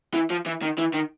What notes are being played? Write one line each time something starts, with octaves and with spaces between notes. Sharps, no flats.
E3
F3
E3
D#3
E3
D#3